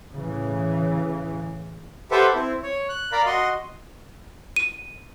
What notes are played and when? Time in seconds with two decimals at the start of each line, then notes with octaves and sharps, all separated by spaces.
0.13 A2 C#3 E3
2.11 G4 A4 B4 C5 E5 F#5
2.35 C4 E4
2.63 C#5
2.89 F#6
3.12 A#4 D5 F5 A#5 B5
3.26 F#4 D#5 C6
4.56 D#7